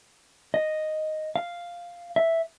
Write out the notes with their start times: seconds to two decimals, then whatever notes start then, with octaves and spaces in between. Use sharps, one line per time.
0.54 D#5
1.36 F5
2.16 E5